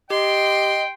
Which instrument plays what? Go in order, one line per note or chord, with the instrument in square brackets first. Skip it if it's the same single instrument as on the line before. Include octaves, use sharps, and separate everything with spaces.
[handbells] G4 [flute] D#5 [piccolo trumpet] G5 [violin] C6